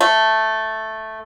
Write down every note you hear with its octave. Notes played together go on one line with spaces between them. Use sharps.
A3